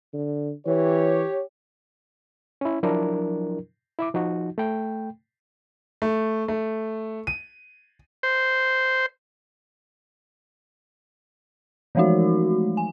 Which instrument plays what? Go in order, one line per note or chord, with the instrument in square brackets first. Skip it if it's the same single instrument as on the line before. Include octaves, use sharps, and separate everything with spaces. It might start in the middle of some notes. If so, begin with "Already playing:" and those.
[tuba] D3
[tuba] E3 [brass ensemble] G4 C#5
[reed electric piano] C#4 E4
F3 F#3 D4 E4 A#4
E4 E5 D6
F3 D#4 F#4
A3 G5
[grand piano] A3
A3
D#7
[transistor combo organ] C5
[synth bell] E3 F3 G#3 A3 D#4 F#4
G#5